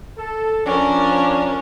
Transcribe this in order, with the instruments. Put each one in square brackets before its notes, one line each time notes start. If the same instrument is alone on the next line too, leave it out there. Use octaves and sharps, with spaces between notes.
[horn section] A4
[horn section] F3 D4 [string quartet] C#4 A#4